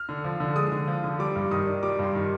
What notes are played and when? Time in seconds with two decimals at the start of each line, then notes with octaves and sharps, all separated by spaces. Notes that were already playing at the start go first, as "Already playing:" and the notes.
Already playing: F6
0.09 D3
0.24 F3
0.40 D3
0.56 G#3 D#6
0.72 D3
0.88 F3
1.04 D3
1.19 G3 D6
1.36 G2
1.51 D#3 D#6
1.67 D4
1.83 G3 D6
1.99 G2 C6
2.15 D#3